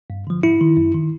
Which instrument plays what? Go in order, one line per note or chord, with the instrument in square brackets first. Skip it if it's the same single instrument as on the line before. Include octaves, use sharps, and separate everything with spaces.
[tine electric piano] G2
D3 F3
G#2 E4
D#3
F#2
D#3